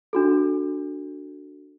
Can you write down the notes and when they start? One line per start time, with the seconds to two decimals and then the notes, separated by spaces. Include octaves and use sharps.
0.13 D4 F#4 A4